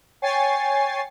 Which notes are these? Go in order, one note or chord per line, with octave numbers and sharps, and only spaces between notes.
C#5 G5 G#5 C#6 A6 C7